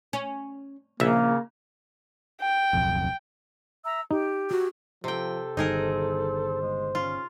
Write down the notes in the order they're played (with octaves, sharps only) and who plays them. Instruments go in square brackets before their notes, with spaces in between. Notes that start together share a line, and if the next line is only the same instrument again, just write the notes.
[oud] C#4
[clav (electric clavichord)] A#1 E5 [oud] C#3 [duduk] A#3
[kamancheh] G5
[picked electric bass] D1 B1 F2
[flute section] E5 A#5 E6
[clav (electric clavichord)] D#4 [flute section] G4
[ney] F#4
[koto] C3 G5 [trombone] F3 [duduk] A4
[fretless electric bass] G1 D#3 [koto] D#4 G#4 A#4 [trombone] C5
[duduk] G#3
[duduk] C#4 [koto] F4